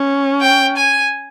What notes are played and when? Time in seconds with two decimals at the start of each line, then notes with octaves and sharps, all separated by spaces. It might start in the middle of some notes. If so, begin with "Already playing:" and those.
Already playing: C#4
0.42 G5
0.77 G#5